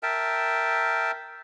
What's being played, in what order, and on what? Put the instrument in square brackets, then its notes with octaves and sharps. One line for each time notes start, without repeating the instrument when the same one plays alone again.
[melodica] A#4 E5 G5 A5